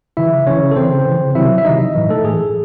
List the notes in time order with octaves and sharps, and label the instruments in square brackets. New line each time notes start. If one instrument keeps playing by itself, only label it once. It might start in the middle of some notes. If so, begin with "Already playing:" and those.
[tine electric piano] C#3 E3 E4 E5
C#3 E3 C#4 C#5
A4
C#3 E3 C4 C5
C#3 E3
C3 D#3 F#3 E4 E5
E5
C3 D#3 F#3 D#4 D#5
A2 E3
A3 A4
A2 E3 G#4